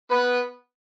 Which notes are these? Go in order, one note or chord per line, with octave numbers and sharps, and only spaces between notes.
B3 B4